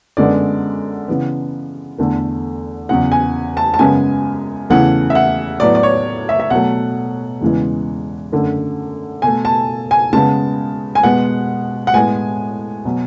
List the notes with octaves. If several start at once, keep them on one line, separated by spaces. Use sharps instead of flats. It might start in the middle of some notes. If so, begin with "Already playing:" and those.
F#2 D3 G#3 B3 D5
C#3 E3 B3
E2 D3 A3
E2 C#3 F#3 F#5
G#5
A5
A5
F#2 C#3 G#3 B3 G#5
E2 C#3 E3 A3 F#5
E5
F#5
A2 F#3 B3 D5
D5
C#5
E5
E5
B2 F#3 A3 F#5
E2 C#3 E3 G#3
F#2 D3 A3
B2 A3 G#5
A5
G#5
C#3 G#3 B3 A5
G#5
B2 G#3 B3 F#5
F#5
A2 G#3 B3 G#5
B2 F#3